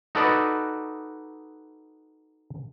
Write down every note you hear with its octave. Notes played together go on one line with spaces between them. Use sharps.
D#4 F#4 A4 B4 D5 D#5